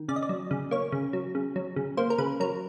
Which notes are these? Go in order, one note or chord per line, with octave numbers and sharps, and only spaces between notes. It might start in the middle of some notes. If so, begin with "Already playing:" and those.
Already playing: D#3
C#3 D5
D#5
D5
F#3
C#3
A#3 C#5
C#3
F#3
C#3
F#3
C#3
A#3 C5
A#4
C#3 B4
F#3 A#4